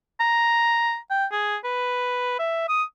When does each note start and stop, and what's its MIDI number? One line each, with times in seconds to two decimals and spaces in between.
0.20 0.97 82
1.10 1.26 79
1.32 1.57 68
1.65 2.36 71
2.39 2.68 76
2.69 2.83 87